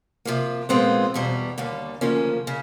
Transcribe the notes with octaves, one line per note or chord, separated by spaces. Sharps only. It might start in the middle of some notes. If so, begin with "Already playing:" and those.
C3 F3 A#3
A#2 F3 G#3 B3 C4
E2 B2 G3
D#2 D3 G3 A#3
D2 C#3 F3 A#3 C#4
C#3